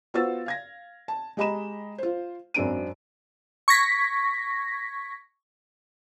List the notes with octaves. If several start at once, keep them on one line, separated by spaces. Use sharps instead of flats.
B3 F4 F#4 C5 E6 A6
F5 G#6 A#6
A5
G#3 G4 D#5 A#5 B5 E7
F4 C5
G#1 F#2 C4 D4 D7 D#7
C#6 G#6 A#6 B6